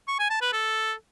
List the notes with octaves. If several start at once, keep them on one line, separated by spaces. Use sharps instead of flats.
C#6
G#5
A5
B4
A4